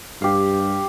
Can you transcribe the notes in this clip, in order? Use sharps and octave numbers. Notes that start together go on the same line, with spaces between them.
G2 G4 F5